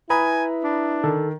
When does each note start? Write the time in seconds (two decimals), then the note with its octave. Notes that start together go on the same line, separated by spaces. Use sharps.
0.10 E4 B4 G#5 A#5 B5 D#6
0.63 D4
1.04 D#3 A4